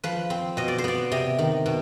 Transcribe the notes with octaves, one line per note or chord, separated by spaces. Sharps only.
F3 B4
C4
B2 D#5
D5
C5
B3 D5
C3 D#5
D#3
B2